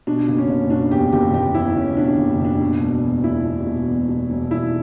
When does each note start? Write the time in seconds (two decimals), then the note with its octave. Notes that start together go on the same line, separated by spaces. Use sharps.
0.07 B2 D4
0.28 F#1
0.38 C#4
0.49 F#1
0.70 B2 D4
0.91 E2 G4
1.13 F#1 G4
1.34 F#1 G4
1.54 E2 E4
1.76 F#1 C#4
1.97 B2 D4
2.18 F#1
2.40 F#1
2.45 D4
2.61 B2
2.82 E1
3.03 E2
3.24 E1 E4
3.45 B2
3.67 B2
3.88 E2
4.09 B2
4.30 E1
4.51 E1 E4